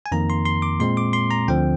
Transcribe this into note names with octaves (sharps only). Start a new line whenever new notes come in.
G#5
F2 D#3 A#3 A#5
C6
C6
D6
A#2 G#3 C4 C6
D6
C6
A#5
D2 D3 F3 C4 G5